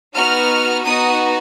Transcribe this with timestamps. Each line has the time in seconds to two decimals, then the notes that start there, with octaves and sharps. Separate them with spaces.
0.15 B3 D#4 F#4 F6
0.86 B3 D#4 F#4 D#6